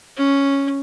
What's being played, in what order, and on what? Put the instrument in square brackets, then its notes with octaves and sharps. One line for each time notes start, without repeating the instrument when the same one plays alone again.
[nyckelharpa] C#4